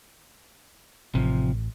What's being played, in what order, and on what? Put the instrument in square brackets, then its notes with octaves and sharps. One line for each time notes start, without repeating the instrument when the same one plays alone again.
[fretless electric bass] A1 [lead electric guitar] C3 F3